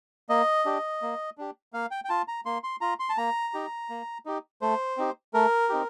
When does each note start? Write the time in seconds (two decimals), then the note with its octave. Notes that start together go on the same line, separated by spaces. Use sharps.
0.29 A#3 D#5
0.66 D4 G4
1.02 A#3
1.38 D4 G4
1.73 A#3 F5
1.91 G5
2.04 G5
2.09 F4 A5
2.28 A#5
2.46 A#3 C6
2.64 C6
2.81 F4 A#5
3.00 C6
3.10 A5
3.17 A#3 A#5
3.54 D#4 G4
3.90 A#3
4.26 D#4 G4
4.61 A3 C5
4.97 C4 D#4 G4
5.34 A3 A#4
5.69 C4 D#4 G4